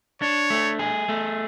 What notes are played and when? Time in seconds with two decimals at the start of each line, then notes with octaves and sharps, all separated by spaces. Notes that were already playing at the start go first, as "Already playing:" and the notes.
0.22 D4 C#5
0.50 A3
0.79 G#4
1.09 A3